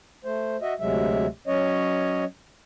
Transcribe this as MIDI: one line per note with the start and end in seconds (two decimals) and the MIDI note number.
0.25 0.57 57
0.25 0.57 72
0.62 0.74 66
0.62 0.74 75
0.62 0.74 76
0.80 1.27 38
0.80 1.27 48
0.80 1.27 54
0.80 1.27 56
0.80 1.27 76
1.47 2.24 54
1.47 2.24 61
1.47 2.24 73
1.47 2.24 75